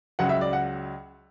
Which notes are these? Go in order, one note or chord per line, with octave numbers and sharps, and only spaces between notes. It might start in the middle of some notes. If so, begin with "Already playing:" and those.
C#2 C#3 F#3 F#5
E5
D5
F#5